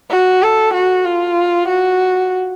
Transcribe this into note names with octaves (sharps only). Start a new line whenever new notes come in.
F#4
A4
F#4
F4
F#4